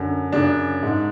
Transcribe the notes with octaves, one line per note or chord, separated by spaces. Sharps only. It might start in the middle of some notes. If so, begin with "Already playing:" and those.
Already playing: F#2 D3
F#2 C#3 D4
G#2